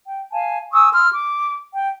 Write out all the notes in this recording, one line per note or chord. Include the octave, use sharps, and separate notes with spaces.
G5
F5 G#5 A5
G#5 C#6 D#6 E6
C6 E6 F6
D6
G5